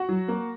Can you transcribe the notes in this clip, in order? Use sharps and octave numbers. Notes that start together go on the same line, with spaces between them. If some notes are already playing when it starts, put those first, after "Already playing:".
Already playing: F#4 F#5
F#3
A#3